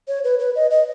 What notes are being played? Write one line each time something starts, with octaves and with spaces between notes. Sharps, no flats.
C#5
B4
B4
D#5
D#5